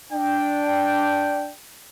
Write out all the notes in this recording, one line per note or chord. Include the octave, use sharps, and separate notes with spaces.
D4 G5